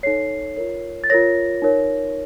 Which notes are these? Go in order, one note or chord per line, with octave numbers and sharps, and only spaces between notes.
D#4 A4 C#5 C7
F4 A#4 C#5
A6
F4 A#4 C#5 A#6
D#4 A#4 C#5